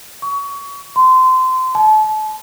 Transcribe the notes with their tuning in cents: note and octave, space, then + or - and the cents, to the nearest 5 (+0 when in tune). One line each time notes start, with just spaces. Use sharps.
C#6 +25
C6 -25
A5 -35